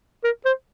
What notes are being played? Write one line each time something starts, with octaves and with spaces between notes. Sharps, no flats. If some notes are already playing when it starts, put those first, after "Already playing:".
A#4
C5